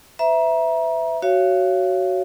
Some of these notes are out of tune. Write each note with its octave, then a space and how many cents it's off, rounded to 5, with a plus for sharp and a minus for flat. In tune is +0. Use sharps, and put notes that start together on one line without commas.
B4 +45 E5 +0 A#5 +30
F#4 +15 C#5 +0 F5 -35